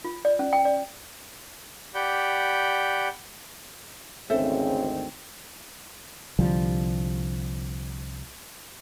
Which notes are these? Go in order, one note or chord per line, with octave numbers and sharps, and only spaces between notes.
F4
D5
C#4
G5
D5
G4 D5 F#5 B5 G6
G#1 D2 C#3 C4 A4 C5 E5
C2 D3 F3 G3